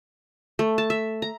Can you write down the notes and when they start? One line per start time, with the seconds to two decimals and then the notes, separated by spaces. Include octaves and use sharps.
0.59 A3
0.78 A5
0.90 E5
1.22 A#5